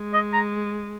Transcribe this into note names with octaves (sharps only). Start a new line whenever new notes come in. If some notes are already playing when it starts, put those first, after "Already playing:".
Already playing: G#3
D#5
A#5